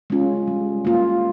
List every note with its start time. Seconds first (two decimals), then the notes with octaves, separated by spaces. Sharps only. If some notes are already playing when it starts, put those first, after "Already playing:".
0.10 G#3 C#4 F4
0.47 G3
0.85 A#3 F4